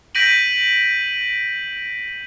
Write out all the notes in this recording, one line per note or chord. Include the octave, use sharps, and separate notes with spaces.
G6 A#6 B6 D7 D#7 F#7